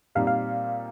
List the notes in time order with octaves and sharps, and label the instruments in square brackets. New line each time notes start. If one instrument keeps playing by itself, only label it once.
[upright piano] A#2 G3 C4 D#4 [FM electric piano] F5
[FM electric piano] F5